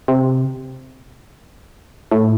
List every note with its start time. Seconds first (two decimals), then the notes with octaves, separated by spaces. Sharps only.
0.08 C3
2.12 A2